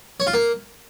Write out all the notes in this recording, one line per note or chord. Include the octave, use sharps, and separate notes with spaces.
C#5
F4
A#3